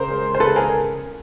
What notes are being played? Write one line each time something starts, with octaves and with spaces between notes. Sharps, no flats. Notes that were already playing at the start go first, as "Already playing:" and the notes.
Already playing: C#3 A#4 C5
G#3
C5
C#3 A4 B4
G#4 A#4